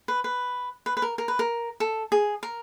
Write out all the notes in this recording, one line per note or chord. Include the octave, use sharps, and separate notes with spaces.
B4
B4
B4
B4
A#4
A#4
B4
A#4
A4
G#4
A#4